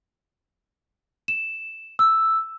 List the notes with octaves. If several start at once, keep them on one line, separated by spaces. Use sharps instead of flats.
E7
E6